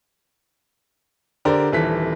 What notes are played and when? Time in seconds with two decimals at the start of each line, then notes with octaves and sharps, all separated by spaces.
1.45 D3 G4 A#4 C5 D5
1.72 D#1 E3 A4 B6